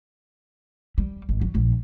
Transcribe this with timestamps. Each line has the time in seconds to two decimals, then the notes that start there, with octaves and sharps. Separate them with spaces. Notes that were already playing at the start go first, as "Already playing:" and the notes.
0.98 G3
1.29 G#1
1.41 F#3
1.55 A#1